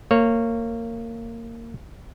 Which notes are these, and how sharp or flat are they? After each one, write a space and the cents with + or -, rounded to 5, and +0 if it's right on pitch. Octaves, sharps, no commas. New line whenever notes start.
A#3 -20 C#5 -5